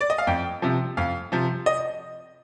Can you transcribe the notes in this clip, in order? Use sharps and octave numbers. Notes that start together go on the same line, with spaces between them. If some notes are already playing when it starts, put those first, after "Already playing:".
D5
D#5
F5
F2 G5
C3 F3
F2 F5
C3 F3
D#5